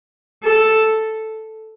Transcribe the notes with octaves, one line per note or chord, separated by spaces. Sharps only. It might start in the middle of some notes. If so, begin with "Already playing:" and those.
A4